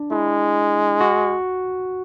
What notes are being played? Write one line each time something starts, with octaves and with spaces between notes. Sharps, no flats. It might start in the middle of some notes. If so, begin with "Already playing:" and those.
Already playing: D4
G#3 E4
F#4